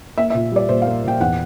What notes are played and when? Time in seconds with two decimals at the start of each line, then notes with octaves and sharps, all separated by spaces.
0.18 A#3 E5
0.30 E5
0.35 A#2
0.52 G3 D5
0.69 A#2 C5
0.82 F5
0.87 A#3
1.04 A#2 G5
1.20 E2 F#5